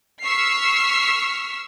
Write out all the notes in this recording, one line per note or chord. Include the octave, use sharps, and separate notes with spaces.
C#6 E6 F6 B6 C7